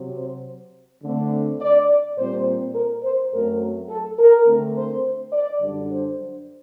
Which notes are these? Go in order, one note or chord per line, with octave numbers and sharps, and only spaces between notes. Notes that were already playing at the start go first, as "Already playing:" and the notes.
Already playing: C3 F#3 C4
C5
D3 A3 C4
D5
A#2 G3 C4 C5
A#4
C5
F#2 F#3 A3 C4 A#4
A4
A#4
D3 A3 C4
C5
D5
F#2 D3 G3 D4
C5